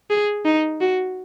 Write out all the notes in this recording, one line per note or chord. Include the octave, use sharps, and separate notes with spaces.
G#4
D#4
F#4